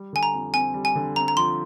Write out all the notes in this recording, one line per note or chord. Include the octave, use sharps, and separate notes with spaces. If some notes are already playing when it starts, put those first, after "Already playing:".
Already playing: G3
D3 G#5
A#5
F2
C4 G#5
G3
G#5
D3
C4 A#5
A#5
F3 C6